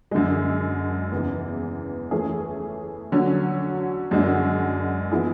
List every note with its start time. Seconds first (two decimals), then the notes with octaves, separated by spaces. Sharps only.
0.11 F#2 D3 G#3
1.12 E2 C#3 E3
2.11 E3 A3 C#4 G#4
3.12 D3 F#3 C#4
4.11 F#2 D3 G#3 D4 F#4
5.12 E3 B3 E4 G#4